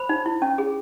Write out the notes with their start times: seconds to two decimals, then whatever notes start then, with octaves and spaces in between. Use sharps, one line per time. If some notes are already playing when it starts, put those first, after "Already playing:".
Already playing: C5 B5
0.09 D#4
0.26 E4
0.42 C#4
0.58 G#4